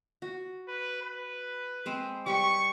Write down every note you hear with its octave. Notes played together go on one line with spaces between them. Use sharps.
F#4
B4
B4
G#3 C4 C5
G3 G4 B4 C#6